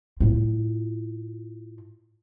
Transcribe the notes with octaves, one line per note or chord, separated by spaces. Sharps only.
A2 F4